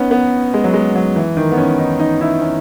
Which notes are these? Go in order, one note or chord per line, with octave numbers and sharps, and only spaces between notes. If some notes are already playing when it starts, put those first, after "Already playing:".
Already playing: B3 C#4 D#4
B3
G#3
F#3
G#3
F#3
E3
D#3
B3
C#4
D#4
D#4
E4
C#4